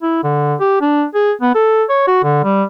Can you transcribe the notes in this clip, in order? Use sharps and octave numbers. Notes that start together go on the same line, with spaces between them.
E4
D3
G4
D4
G#4
B3
A4
C#5
F#4
D3
G3